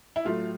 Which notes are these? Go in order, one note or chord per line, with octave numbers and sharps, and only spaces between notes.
E4
A2 F#3 A3 F4